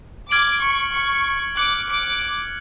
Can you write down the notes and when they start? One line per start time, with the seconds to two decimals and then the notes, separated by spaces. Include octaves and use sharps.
0.31 D6 F6 G#6 D7 F#7
0.62 C#6
0.94 C#6
1.57 D6 F#6 C#7 F#7
1.89 D6